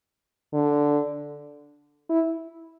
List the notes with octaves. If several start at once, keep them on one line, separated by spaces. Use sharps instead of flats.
D3
E4